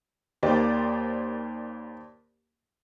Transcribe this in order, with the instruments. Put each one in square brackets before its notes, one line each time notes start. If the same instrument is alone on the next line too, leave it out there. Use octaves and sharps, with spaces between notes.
[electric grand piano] D#2 A#3 [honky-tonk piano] G4 C5 D5